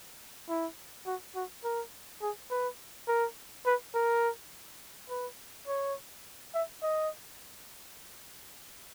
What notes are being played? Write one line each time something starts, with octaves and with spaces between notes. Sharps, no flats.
E4
F#4
F#4
A#4
G#4
B4
A#4
B4
A#4
B4
C#5
E5
D#5